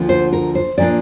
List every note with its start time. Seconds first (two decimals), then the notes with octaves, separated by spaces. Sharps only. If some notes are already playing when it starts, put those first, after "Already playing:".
Already playing: D2 D3 F3 A#3 D4
0.09 C5
0.33 A#4
0.55 C5
0.78 A#2 F3 A#3 D4 D5